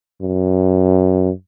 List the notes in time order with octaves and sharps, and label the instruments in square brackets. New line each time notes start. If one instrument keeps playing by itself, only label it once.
[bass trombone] F#2